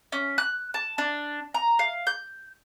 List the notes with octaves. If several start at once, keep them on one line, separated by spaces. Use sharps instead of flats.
C#4
F#6
A5
D4
A#5
F5
G6